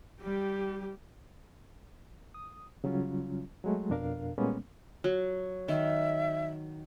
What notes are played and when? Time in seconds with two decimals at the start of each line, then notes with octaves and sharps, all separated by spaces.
0.21 G3 G4
2.34 D#6
2.84 C#3 F#3 G3 C#4 F4
3.64 F#3 G#3 A3
3.90 F2 B2 D4 A#4 F5
4.38 A#2 G3 G#3 A#3 B3 C#4
5.04 F#3
5.68 D#3 E5